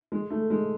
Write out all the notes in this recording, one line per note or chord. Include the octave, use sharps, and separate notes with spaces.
G#3
A3
G#3